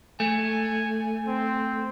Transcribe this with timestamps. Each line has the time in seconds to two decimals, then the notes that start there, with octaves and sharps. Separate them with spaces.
0.20 A3 G#5
1.27 C4